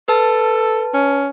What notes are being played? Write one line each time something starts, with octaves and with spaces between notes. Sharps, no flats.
A4 B4 A5
C#4